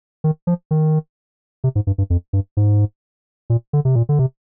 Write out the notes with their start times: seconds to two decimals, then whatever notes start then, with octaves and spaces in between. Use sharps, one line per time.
0.24 D#3
0.47 F3
0.71 D#3
1.64 C3
1.75 G#2
1.87 G2
1.98 G2
2.10 F2
2.33 G2
2.57 G#2
3.50 A#2
3.73 D3
3.85 C3
3.96 A#2
4.09 D3
4.19 C3